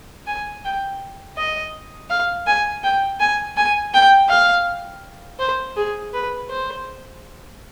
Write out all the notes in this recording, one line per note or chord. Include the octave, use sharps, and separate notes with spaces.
G#5
G5
D#5
F5
G#5
G5
G#5
G#5
G5
F5
C5
G#4
B4
C5